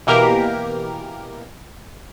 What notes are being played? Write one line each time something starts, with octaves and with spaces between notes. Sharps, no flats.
B2 E3 A#3 G4 A#4